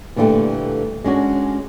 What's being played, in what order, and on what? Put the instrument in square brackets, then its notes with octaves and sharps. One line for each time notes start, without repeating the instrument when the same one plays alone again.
[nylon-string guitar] A#2 D3 E3 F#3 G3 A3
G#3 C#4 D4 F#4